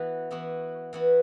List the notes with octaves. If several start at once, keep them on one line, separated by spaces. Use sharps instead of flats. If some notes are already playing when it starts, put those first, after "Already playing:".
Already playing: E3 B3 F#4
E3 B3 F#4
E3 B3 F#4